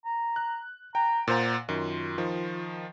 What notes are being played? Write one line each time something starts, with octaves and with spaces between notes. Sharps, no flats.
A#5
F#6
G5 A#5
A#2 C5 F#5 A#5
F#2 D#3 F4
D#3 F3